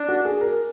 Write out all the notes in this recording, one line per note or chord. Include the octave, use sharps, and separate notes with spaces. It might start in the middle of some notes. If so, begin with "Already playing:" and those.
Already playing: D4
F#4
G#4
A#4